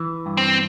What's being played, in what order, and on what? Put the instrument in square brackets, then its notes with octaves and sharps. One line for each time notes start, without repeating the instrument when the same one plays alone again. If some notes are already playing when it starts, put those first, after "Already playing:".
Already playing: [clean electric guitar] E3
G2
[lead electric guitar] C4